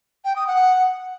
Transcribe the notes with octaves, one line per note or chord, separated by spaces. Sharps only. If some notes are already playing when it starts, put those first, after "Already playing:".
G5
D#6
F#5